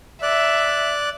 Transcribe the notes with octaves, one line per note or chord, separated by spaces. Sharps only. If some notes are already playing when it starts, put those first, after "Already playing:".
D5 E5 F#6